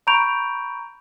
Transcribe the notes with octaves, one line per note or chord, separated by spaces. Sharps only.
A#5 B5 C#6 G6 D7 F7